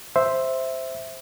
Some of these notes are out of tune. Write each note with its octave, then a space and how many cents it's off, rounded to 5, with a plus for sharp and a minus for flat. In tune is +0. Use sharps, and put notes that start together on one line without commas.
C5 +0 E5 +0